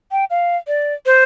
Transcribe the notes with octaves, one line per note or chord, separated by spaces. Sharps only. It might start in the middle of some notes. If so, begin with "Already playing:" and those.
G5
F5
D5
C5